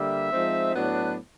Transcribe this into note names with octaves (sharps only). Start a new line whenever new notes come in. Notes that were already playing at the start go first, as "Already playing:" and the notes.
Already playing: D3 G3 A#3 E5
F3 G#3 C4 D#4
A2 F#3 B3 D4